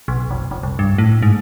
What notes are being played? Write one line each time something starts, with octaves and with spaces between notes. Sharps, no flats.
B1
F1
F1
C2
G2
A2
G#2